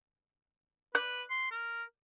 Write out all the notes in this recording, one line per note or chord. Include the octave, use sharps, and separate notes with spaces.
B4 F#6
C6
A#4